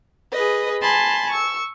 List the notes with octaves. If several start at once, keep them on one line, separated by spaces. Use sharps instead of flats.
G#4 B4 D#5
G#5 A5 B5 C6
C#6 E6